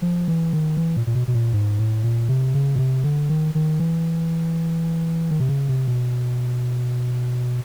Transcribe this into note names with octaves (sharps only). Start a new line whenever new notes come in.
F3
E3
D#3
E3
A#2
A#2
B2
B2
A#2
G#2
A2
A#2
C3
C#3
B2
C3
D3
D#3
D#3
E3
D#3
C3
C#3
C3
B2